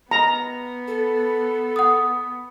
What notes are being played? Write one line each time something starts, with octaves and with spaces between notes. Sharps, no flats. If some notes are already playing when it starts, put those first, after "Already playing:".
B3 A#5
A4
F#5 D#6